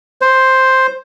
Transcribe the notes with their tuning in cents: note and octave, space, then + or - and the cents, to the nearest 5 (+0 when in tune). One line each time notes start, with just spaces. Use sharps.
C5 +5